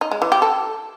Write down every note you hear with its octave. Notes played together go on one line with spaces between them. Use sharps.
D#4
G#3
E3
G4
A4